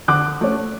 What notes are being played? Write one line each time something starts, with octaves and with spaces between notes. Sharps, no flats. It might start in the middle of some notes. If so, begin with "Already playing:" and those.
D3 D6 F#6
A3 C#4